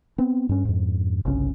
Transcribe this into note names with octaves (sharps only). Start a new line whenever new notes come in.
B3 C4
G2 C#4
F2 G#2
G1 C2 C#3 C#4